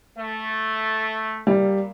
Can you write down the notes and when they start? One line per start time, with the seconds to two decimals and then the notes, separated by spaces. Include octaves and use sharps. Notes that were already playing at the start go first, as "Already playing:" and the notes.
0.17 A3
1.47 A#2 G3